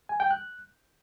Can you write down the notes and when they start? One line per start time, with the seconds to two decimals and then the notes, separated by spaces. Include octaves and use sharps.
0.09 G#5
0.20 G5
0.31 F#6